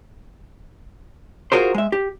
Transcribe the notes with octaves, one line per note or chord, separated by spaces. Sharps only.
F4 F#4 G#4 A#4 C5
G#3 E5
G4